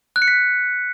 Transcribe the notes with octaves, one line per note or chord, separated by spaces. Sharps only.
F#6
C#7
B6